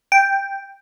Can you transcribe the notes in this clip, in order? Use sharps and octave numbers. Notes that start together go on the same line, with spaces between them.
G5